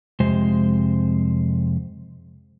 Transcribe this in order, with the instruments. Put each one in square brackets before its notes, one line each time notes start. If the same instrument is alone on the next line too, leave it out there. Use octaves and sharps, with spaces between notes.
[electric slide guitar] F2 C3 G#3 C5